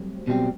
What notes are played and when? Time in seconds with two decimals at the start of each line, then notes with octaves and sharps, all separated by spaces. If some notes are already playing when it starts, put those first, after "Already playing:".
Already playing: F#3 G3 A3 C4
0.27 B2 G3 C4